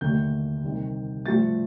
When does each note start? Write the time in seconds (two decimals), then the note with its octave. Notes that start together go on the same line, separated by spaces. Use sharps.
0.01 D#2 D3 A3 G6
0.64 C2 C3 D#3
1.26 G2 F3 A3 A6